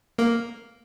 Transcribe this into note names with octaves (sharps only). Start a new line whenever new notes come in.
A#3